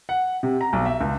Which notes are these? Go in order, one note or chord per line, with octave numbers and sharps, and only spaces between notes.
F#5
C3
A#5
B1
E5
C#2